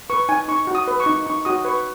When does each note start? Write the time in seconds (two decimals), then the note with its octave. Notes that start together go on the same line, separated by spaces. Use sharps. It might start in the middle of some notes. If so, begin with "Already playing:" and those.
0.10 B4 C#6
0.29 D#4 G#5
0.48 D#4 C#6
0.67 F#4
0.75 D#6
0.88 B4
1.00 C#6
1.06 D#4
1.26 D#4 C#6
1.45 F#4 D#6
1.65 B4 C#6